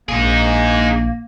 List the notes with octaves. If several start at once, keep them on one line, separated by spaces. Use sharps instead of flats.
A#1 A#3 D#4 G#4